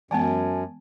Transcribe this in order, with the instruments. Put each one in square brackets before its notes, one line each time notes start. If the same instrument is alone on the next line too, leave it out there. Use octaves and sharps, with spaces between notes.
[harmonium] F#2 [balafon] E3 G#3 B3 [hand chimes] G#5 A5